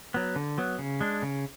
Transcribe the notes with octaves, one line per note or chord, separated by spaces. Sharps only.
F#3 B3
D3
F#3 B3
C#3
G#3 D4
C#3